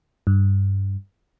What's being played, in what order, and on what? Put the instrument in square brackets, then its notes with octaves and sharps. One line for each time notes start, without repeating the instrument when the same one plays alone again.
[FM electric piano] G2